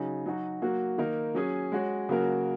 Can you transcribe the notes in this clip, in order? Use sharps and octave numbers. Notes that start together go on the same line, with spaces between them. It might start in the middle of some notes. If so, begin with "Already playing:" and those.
Already playing: C#3 F#3 D#4
F#3 D#4 F#4
F#3 A#3 F#4
D#3 A#3 D#4 A#4
F#3 C#4 G#4
G#3 F#4 C#5
C#3 F#3 A#3 F#4 A#4